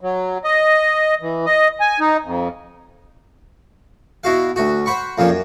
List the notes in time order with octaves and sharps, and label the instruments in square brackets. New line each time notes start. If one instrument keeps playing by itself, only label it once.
[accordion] F#3
D#5
E3
D#5
G#5
D#4
F2
[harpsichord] B2 E4 F#4 F5
D2 F#4
C5 F#5 B5 C#6
F2 A#2 F3 C#4
F#2